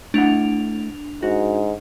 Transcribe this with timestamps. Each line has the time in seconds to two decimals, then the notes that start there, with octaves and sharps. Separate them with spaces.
0.14 A3 D4 E4 F#5 F7
1.23 G#2 F#4